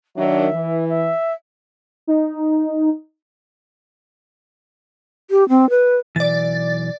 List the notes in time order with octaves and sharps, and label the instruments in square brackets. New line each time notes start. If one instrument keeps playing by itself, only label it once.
[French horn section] D#3 F#3 D4 [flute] E5
[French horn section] E3
[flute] E5
[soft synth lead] D#4
[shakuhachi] G4
C4
B4
[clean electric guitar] B1 G#2 E3 [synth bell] D5 A6